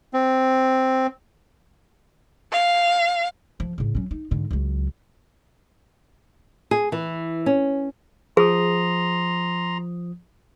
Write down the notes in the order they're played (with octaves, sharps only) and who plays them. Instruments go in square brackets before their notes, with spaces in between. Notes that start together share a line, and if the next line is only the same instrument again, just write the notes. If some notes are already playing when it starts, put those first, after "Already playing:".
[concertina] C4
[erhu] F5
[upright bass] F3
A2 C#3
F#3 C#4
D#4
G#2 D3
C#2 F#3
[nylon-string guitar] G#4
E3
C#4
[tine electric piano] F3 D#6 [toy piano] G#4 [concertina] A#5 C6